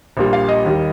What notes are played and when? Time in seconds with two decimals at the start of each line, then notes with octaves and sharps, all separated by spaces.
0.17 A#1 A#2 G3
0.33 F5
0.49 D#5
0.65 D#2 D#3 G3